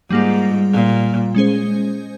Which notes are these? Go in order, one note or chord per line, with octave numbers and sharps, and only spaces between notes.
G#2 G3 A#3 F4
A#2
G#3 C#4 G#4 C5